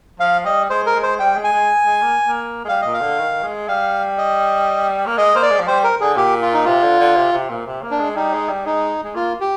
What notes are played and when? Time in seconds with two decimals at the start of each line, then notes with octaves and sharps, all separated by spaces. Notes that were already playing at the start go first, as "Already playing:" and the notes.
0.20 F3 F5
0.45 G3 D#5
0.70 G#3 C5
0.86 A#4
0.95 G#3
1.03 C5
1.19 G3 G5
1.36 G#3
1.44 G#5
1.53 G#3
1.85 G#3
2.02 A#3
2.27 A#3
2.65 G#3
2.68 G3 F5
2.81 A#2 D#5
2.94 F5
3.02 D3
3.19 D#3
3.43 G#3
3.68 G3 F5
4.18 D#5
5.06 A#3
5.18 G#3 D#5
5.34 A#3 C5
5.42 D5
5.50 G#3
5.60 F3
5.67 G3 C5
5.84 A#4
6.01 D3 G#4
6.17 A#2 G4
6.42 F4
6.53 D#4
6.65 C3 F4
6.83 D3
7.00 D3
7.17 C3
7.33 C3
7.49 A#2
7.67 C3
7.83 A#3
7.91 D4
7.99 G#3
8.15 G3 D#4
8.33 G#3
8.49 G3
8.65 G#3 D#4
9.04 G#3
9.15 A#3 F4
9.40 G4